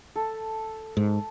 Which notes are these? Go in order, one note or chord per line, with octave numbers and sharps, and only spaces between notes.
A4
G#2